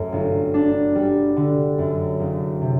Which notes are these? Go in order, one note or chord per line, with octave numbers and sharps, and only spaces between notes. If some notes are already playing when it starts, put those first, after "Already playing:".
Already playing: F#2 F#3 A3
G1
D4
G3
D3
F#2
F#1
C3